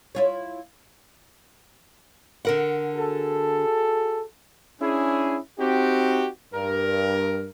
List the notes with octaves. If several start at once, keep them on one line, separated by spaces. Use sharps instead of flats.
E4 F4 C#5
D3 A#4 F#5
F#4 G#4 A4
C#4 D4 E4 G#4
C4 D#4 F#4 G4
G2 A#4